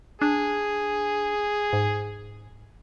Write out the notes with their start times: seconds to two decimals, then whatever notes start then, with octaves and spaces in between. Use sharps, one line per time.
0.22 D4 G#4
1.73 G#2